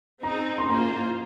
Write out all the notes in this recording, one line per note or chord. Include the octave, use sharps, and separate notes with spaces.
C4 D#4 G#4 A#5
C6
A#3 F4 C5 A#5